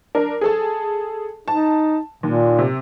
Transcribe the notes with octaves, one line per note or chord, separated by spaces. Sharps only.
D4 A#4
G#4 A4 A5
D#4 A5
D#2 A#2
C3